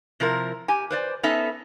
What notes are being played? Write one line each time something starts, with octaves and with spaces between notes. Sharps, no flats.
C3 F3 E4 A#4
G4 G#5
B4 C5 D5
B3 C#4 D#4 A4 E5 A5